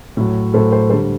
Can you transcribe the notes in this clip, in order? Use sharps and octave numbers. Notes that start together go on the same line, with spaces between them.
A2 F#3
A2 F#3 A4 C5
A4 C5
D3 G3 A4 C5